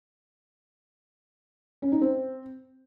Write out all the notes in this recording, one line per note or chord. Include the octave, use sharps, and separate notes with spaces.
C#4
D#4
C4